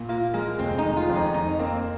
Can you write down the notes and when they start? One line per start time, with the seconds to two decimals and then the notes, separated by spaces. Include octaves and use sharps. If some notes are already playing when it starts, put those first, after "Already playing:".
Already playing: A#2
0.09 A#3 F4
0.34 G#3 A#3
0.59 F1 C4
0.78 D#4
0.84 D#3
0.97 F4
1.09 F2
1.15 D#4
1.34 F2 D#4
1.59 A#3 C4